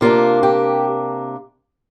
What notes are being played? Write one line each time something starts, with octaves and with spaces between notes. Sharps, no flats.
C3 A#3 D4 F4
G4